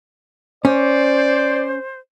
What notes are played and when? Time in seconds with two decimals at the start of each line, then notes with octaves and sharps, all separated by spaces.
0.65 C#4 C5 D5